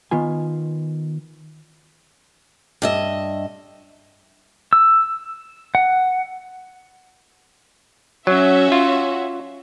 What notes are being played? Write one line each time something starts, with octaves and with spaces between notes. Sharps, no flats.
D#3 B3 F4 G#5
G2 D#5 E5
E6
F#5
F#3 C#4 F#4 E5
F4